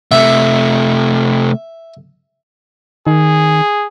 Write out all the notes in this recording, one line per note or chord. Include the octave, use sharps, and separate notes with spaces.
C3 A3 E5
D#3 G#4